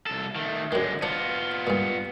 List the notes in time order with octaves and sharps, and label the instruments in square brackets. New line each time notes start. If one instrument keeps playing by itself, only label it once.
[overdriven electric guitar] C2 A4
D#3 A3
[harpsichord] F#2 D#3 [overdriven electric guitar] D3 G#3
[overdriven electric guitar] B3 F4 [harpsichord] D4 C5
[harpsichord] G2 A#2